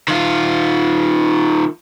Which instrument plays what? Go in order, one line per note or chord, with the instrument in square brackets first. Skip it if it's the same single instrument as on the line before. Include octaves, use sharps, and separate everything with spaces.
[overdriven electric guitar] D#3 F4